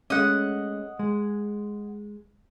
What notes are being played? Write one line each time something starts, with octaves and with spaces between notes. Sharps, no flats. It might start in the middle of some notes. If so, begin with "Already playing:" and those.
G#3 A3 C#4 D#5 F#5
G#3